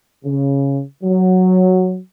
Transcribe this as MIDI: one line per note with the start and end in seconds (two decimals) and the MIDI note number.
0.24 0.81 49
1.04 1.97 54